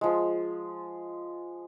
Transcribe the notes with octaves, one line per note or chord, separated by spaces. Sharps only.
F3 G#3